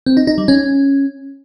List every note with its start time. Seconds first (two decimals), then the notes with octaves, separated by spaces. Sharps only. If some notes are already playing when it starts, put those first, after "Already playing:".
0.06 C4
0.17 D#4
0.27 D#4
0.38 G3
0.48 C#4